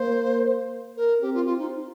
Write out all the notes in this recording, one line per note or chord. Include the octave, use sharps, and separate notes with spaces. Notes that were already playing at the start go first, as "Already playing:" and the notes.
Already playing: A#3 C5
A#4
C4 G4
F4
F4
D#4